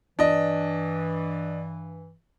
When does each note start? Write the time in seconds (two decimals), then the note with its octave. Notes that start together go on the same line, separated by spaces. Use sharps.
0.19 G2 E3 D4 D#5